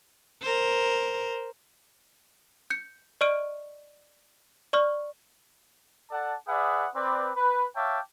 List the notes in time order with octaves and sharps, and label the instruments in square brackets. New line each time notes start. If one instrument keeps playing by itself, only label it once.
[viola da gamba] A#4 C5
[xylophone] G6 C#7
D5 D#5 C#6 F6 D7 D#7
D5 C#6 F6
[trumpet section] A4 D5 F#5 A5
G#4 B4 D5 E5 F#5 D#6
C4 B4 D5
B4
C#5 E5 F5 G5 A5 D6